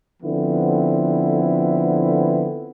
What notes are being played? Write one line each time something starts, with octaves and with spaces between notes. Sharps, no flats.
D3 F3 B3 C4 E4